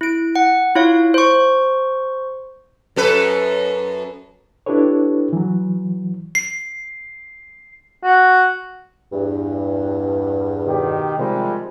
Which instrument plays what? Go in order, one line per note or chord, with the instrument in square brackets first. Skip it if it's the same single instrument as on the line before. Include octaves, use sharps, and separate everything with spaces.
[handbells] E4 D7
F#5
E4 F4 C#5 F5
C5 C#6
[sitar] F#2 A4 B4
[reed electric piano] D4 E4 G4 A4 B4 C#5
E3 F#3
[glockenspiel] C7
[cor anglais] F#4
[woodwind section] E2 G2
[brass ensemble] B2 D#3 G4
[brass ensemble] C3 G3 G#3 [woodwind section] D#3 F3